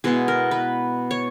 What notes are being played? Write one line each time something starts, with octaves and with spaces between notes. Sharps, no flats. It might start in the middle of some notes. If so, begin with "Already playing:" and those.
B2 G#3 B3 E4 G#4
A#4
B4
C#5